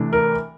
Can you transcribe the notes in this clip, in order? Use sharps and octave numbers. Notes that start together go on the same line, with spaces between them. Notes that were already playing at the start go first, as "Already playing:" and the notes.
Already playing: C3 E3 A3 D4
A#4